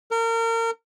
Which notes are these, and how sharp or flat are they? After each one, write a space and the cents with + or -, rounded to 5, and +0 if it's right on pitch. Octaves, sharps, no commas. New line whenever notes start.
A#4 -30